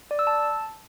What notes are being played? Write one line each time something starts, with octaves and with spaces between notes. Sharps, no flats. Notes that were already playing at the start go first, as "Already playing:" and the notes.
D5
E6
A5